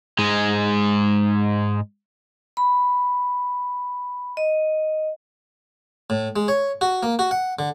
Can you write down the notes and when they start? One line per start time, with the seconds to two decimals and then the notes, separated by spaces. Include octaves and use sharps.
0.19 G#2 G#3
2.57 B5
4.37 D#5
6.10 A2
6.36 G#3
6.48 C#5
6.81 F#4
7.03 A#3
7.19 F#4
7.31 F#5
7.59 D3